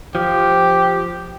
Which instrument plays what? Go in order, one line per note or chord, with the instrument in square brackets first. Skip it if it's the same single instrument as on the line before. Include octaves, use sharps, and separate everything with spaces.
[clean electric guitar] F3 [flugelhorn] G4